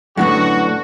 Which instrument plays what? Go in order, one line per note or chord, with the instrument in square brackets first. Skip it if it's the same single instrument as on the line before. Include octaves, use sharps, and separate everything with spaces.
[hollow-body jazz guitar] F#2 A2 B3 [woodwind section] D3 [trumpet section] F#4